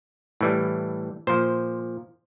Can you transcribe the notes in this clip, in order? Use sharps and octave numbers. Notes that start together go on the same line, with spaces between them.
A2 E3 G3
A#2 F3 C5